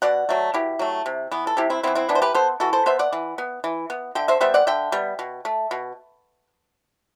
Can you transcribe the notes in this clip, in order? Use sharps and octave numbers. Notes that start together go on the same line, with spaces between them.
B2 D5 F#5
F#3 A3
B2 E4 G4
F#3 A3
C3
E3 B3
A4
C3 E4 G4
C4 E4
E3 B3 C4 E4
C4 E4
E3 B3 D4
C5
G4 B4
B3 A4 C5
E3 F#4 A4
A4 C5
B3 C5 E5
D5 F#5
E3
B3
E3
B3
D3 E5 G5
C5 E5
G3 B3 C5 E5
D5 F#5
D3 E5 G5
G3 B3
B2
A3
B2